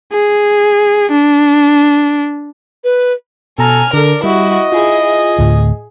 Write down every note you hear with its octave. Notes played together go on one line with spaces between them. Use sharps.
G#4
D4
B4
B2 A4 G#5 A#5 F6
D3 A4 A#4 D5
G3 E4 F#4 D#5
E4 F4 G#4
G#4
D2 A2